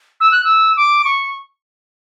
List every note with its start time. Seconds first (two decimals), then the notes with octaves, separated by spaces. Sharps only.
0.20 E6
0.32 F#6
0.44 E6
0.77 D6
1.05 C#6